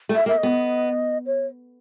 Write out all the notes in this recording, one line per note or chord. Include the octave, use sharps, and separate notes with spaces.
A3
E5
A#3
E5
D#5
B3
C#5